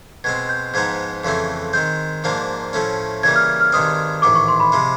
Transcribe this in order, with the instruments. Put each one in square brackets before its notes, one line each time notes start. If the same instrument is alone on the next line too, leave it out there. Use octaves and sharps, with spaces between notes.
[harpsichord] B2 G#3 C4 [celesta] G#6
[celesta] G6
[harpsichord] G#2 F3 G#3 B3 D#4 [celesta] G#6
[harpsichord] F2 C#3 E3 A3 C4
[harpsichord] D#3 G#3 C4 [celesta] G6
[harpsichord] G#2 F3 A#3 D4
A2 F3 A3 C#4
[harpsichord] C#3 E3 G3 A#3 [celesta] G#6
[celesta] F6
F6
[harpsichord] G2 D#3 G#3 C4 [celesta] D#6
[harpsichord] A1 G#2 D#3 [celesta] D6
[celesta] C#6
C6
B5
[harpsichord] C3 F3 G#3